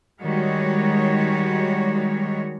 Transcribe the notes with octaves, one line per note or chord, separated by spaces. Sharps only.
D#3 G3 G#3 F#4 C#5